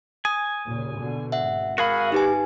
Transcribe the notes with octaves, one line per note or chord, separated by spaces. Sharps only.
G#5 D#6
D#2 A#2 C#3
B2 D3
G#1 E5 F#5
F#4 G#4 A#4 F5 B5
D#4 G4 B4 G#5